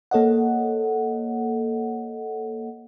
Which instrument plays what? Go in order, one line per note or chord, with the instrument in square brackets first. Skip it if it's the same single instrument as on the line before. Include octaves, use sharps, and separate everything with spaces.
[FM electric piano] A#3 A4 C#5 D#5 F#5